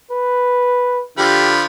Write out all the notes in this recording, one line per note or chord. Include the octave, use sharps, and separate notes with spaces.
B4
D3 F3 G4 B5